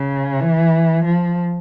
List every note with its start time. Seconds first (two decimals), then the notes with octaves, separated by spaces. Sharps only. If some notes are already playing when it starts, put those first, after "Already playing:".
Already playing: C#3
0.41 E3
1.05 F3